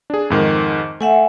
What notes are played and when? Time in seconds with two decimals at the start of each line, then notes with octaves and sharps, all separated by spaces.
0.10 D4 G#4
0.30 F2 G#2 D#3
1.01 A3 E5 F#5 G#5